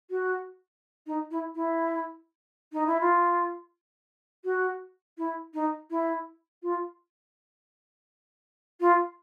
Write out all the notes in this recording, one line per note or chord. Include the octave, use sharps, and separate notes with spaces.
F#4
D#4
E4
E4
D#4
E4
F4
F#4
E4
D#4
E4
F4
F4